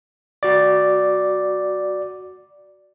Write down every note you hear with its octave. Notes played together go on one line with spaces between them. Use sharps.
F#4 D5